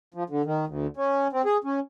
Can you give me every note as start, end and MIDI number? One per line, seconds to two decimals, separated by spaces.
0.14 0.23 53
0.30 0.42 50
0.45 0.65 51
0.67 0.87 38
0.97 1.28 61
1.32 1.42 60
1.45 1.57 68
1.64 1.80 61